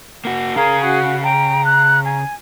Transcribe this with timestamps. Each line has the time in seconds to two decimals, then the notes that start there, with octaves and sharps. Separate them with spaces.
0.25 A#3 F#4
0.56 C#3 G#4 A#4 F5
0.85 F#4
1.24 G5 A#5
1.65 F#6
2.05 G#5